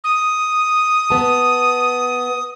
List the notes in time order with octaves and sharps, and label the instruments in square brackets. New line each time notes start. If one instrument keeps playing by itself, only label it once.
[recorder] D#6
[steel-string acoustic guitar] B3 A5